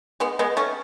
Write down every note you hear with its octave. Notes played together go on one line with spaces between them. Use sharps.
G#3 B3
G#3 B3
A3 C#4